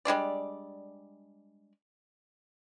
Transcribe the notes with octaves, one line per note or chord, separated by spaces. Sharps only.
G3 G#3 D4 D5